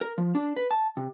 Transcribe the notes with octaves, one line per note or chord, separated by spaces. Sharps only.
A#4
F3
D4
B4
A5
C3